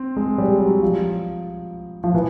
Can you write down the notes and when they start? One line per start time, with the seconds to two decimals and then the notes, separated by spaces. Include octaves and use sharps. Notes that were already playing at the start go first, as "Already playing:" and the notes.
Already playing: C4
0.17 G#3
0.38 G3
0.60 F#3
0.83 F3
2.04 F3
2.14 E3